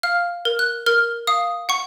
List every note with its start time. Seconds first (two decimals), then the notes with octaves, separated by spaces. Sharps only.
0.03 F5 F6
0.45 A#4
0.59 F#6
0.86 A#4 F6
1.27 F5 D#6
1.69 F#5 C#6